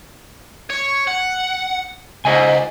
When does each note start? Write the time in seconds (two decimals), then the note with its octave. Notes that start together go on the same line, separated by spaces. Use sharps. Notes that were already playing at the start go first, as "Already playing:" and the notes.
0.70 C#5
1.07 F#5
2.25 C#2 C5 D#5 G#5